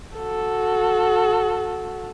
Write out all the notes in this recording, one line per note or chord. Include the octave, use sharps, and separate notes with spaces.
F#4 A4